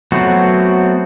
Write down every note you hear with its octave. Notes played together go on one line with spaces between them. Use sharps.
F#3 A3 B3 C4 F#4